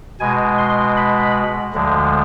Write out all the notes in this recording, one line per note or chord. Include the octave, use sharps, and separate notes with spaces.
B2 G#3 G#5
C6
B5
D2 D3 F3 G#3